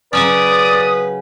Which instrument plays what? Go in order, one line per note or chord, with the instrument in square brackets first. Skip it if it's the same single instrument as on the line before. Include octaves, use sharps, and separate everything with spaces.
[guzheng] C#3 F#3 C#4 [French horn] B4 [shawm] D5 [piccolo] D#6